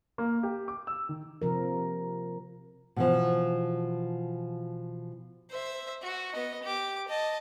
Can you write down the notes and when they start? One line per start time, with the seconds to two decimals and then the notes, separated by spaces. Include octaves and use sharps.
0.18 A#3
0.43 G4
0.68 D6
0.87 E6
1.09 D#3
1.42 C3 F3 A#4
2.96 B2 E3 F3
5.50 C5 E5
6.02 F#4
6.33 B3 D#5
6.63 G4 D6
7.08 D#5 A5